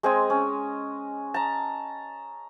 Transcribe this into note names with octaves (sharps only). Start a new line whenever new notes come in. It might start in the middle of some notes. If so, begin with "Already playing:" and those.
G#3 C4 D#5 G#5
C#4
A5 A#5